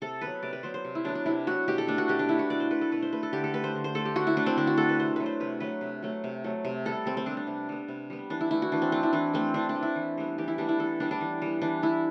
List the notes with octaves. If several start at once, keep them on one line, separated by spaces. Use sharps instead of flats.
C3 A4
F#3 B3 B4
C3 D5
B4
F#3 B3 C5
C5
C3
E4
F#3 B3 D4
D4
C3 E4
F#3 B3 F#4
B2 G4
A4
A3 D4
F#4
B2 G4
D4
A3 E4
F#4
B2 D5
C5
A3 B4
A4
B2 B4
C5
A3 B4
A4
D3 G4
A4
A3 B4
C5
D3
C5
A3 A4
G4
D3 F#4
E4
A3 D4
C4
D3 D4
F#4
A3 A4
B4
C3 C5
F#3 A3 B4
C5
C3 B4
F#3 A3 B4
C3
F#3 A3
C3
F#3 A3
C3
G3 B3 A4
C3 C4
C4
G3 B3 D4
D4
C3
G3 B3
C3
G3 B3
E3 D4
E4
A3 E4
F#4
E3 D4
C4
A3 D4
E4
E3 D4
A3 C4
E3 D4
D4
A3
E4
E3
G3 B3
E3 G4
E4
G3 B3 D4
E4
E3 A4
G3 B3 D4
D4
E3
G3 B3
E3 D4
B3 E4